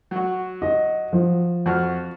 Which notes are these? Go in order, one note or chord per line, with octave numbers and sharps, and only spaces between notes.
F#3 F#4
D#5
F3
F2 F#4 F6